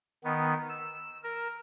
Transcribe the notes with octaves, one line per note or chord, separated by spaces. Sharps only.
D#3 B3
E6
A#4